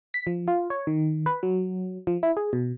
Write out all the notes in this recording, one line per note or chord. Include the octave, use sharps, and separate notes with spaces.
B6
F3
F4
C#5
D#3
B4
F#3
F3
E4
G#4
B2